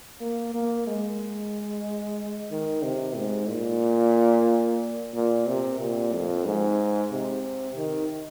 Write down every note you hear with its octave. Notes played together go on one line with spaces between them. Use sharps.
A#3
A#3
G#3
D#3
C3
G#2
A#2
A#2
C3
A#2
F2
G#2
C3
D#3